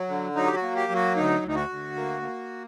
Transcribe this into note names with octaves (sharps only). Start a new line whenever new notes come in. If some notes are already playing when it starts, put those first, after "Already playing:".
Already playing: F#3
D3
F#3 D#4
G4
F#4
A#3
G4
F#3
F#4
D2 D#4
D2
D#4
F#4
D2
A#3
A#3